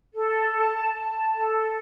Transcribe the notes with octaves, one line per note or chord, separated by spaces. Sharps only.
A4
A5
A5
A4